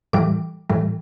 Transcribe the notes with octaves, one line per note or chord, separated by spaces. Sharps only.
A2 E3 G3 D6
A2 E3 G3